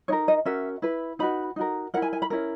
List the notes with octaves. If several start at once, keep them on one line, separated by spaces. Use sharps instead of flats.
D#4 A#4 C#5
D#5
C#4 F#4 A#4 E5
E4 B4
D#4 F#4 B4 B5
D#4 F#4 A#4
E4 A#4 F#5
G#5
G#5
B5
C#4 E4 A#4